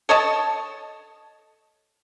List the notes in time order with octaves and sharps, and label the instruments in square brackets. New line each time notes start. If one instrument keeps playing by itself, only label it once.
[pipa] A4 C#5 D#5 A5